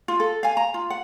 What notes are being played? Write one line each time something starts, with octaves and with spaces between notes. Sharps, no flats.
F4
A4
F5 G#5
A#5
F4
F#5